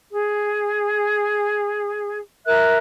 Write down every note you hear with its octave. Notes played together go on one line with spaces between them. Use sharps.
G#4
A#4 E5 F#6